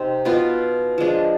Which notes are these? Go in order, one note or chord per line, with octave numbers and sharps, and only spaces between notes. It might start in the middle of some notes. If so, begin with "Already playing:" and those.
Already playing: C3 C4 D#4
B2 B3 F4 B4
F3 G#3 D4